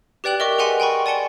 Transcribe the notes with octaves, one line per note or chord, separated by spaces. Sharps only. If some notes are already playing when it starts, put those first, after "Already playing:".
G4 B4 D5 G5 F#6 F#7
A#4 D#5 E5 C#6 D6
G#4 A#4 E5 F#5 G#5 C6
G5 G#5 B5 C#6
D5 G#5 A5 C#7 G7